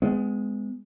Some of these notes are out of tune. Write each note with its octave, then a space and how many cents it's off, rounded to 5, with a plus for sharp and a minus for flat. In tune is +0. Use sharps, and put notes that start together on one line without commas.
G#3 +0 B3 +35